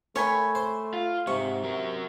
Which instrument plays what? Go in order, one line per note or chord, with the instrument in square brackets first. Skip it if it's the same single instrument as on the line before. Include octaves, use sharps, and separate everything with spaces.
[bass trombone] A3 [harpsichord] A#4 G5 [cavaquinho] C#5 G#5 B5
[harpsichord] C5
[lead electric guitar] F4
[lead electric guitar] G#2 [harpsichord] C3 [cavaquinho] C#6
[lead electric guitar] F#3 A#4